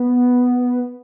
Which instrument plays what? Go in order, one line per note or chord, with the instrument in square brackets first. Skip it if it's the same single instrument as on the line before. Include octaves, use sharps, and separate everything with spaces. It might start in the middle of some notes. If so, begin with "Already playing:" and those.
Already playing: [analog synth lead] B3